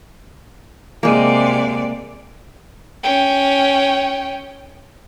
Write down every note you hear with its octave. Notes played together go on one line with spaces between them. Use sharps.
C3 G#3 A#3 D5
C#4 G5